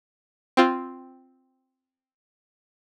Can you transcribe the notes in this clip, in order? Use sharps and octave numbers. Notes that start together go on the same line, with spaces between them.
C4 F4